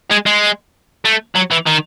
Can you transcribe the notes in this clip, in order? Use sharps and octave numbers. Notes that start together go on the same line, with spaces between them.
G#3
G#3
A3
F#3
E3
D#3